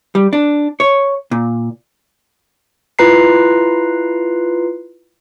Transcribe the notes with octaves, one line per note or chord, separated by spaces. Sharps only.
G3
D4
C#5
A#2
E4 F4 B4 A#5 C7